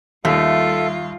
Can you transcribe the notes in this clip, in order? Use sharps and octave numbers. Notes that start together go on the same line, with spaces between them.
D#2 G3 A3 F4 A4 E5